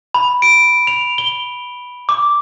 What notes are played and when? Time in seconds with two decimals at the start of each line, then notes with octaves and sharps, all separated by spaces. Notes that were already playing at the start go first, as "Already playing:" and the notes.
0.14 B5
0.42 D7
0.87 F7
1.18 G7
2.09 D6